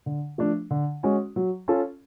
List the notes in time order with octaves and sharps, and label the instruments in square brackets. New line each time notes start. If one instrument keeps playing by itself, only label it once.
[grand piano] D3
F3 A3 D4
D3
G#3 C#4 F#4
F#3
C#4 F4 A4